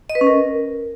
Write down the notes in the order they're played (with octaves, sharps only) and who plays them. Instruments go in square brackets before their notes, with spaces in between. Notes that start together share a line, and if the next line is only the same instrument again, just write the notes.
[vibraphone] D#5
B4
C#4
A#4